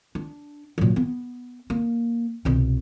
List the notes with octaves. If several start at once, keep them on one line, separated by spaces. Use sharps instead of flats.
D4
A#2 F#3
B3
A#3
C2 B2